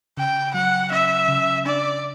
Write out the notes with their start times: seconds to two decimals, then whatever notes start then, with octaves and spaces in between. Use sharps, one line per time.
0.17 C#3 G5
0.54 F#3 F#5
0.91 C#4 E5
1.28 C#3
1.66 D4 D5